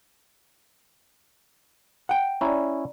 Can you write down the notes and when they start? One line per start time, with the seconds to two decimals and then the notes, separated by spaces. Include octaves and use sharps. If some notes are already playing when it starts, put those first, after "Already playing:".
2.09 F#5 G5
2.41 C#4 E4 D5 A#5